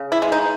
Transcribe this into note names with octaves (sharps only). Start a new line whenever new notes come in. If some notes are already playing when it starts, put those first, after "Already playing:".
Already playing: C#3
E4
G#3
D#4